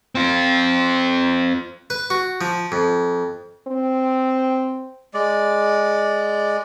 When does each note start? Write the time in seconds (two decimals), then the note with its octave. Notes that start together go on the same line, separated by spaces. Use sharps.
0.15 C4 F4
1.90 B4
2.10 F#4
2.41 F3
2.72 F2
3.68 C4
5.14 G#3 D5